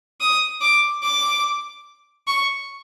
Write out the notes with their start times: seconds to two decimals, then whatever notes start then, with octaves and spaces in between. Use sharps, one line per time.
0.21 D#6
0.61 D6
1.03 D6
2.27 C#6